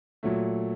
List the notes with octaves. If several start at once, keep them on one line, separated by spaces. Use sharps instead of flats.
A#2 F#3 A3